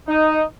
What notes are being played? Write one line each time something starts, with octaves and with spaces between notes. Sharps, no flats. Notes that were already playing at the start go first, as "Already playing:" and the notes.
D#4